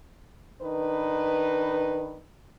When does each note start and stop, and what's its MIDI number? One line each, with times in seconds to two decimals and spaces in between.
0.62 2.20 51
0.62 2.20 62
0.62 2.20 63
0.62 2.20 71